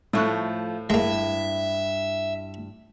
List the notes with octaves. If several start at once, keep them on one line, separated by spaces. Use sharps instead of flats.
A2 F3 A3 C#6 F#6
G2 G#3 A#3 E4 E5